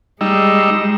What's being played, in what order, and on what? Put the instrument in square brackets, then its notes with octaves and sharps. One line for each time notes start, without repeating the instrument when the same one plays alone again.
[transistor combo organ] G3 D#4 E6 [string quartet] G#3